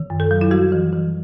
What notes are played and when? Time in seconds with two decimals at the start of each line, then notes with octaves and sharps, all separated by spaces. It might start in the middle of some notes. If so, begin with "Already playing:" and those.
Already playing: D#3
0.10 F#2
0.20 A4
0.31 F#3
0.41 E4
0.51 G3 F#4
0.72 E3
0.93 E3